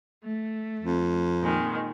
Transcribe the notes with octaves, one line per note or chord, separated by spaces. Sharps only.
A3
F2
A#2 D#3 G#3